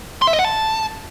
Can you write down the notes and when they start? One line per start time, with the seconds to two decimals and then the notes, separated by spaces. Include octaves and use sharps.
0.22 C6
0.27 E5
0.33 D#5
0.39 F#5
0.45 A5